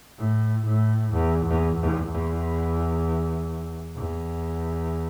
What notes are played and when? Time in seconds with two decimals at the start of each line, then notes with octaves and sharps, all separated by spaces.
0.18 A2
0.66 A2
1.13 E2
1.44 E2
1.76 E2
2.07 E2
3.95 E2